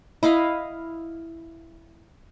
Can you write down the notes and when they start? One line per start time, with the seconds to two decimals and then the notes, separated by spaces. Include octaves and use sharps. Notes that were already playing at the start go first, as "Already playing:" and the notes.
0.23 E4 D#5 F5 B5